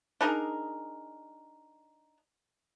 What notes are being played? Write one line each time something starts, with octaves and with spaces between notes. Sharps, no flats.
D4 D#4 G#4 A#4